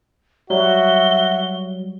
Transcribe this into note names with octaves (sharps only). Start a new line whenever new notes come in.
F#3 G3 F#4 E5 G7